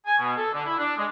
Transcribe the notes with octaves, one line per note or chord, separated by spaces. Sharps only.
G#5
B2
A4
D3
E4
D4
G#3